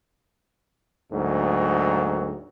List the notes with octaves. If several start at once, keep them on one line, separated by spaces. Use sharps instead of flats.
D2 G#2 F#3 A#3